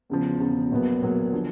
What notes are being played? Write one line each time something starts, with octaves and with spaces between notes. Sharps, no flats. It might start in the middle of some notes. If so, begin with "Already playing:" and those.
E2 C#3 F3
E2 C#3 F3
A#1 A#2 F#3 B3
A#1 A#2 F#3 B3
D3 F3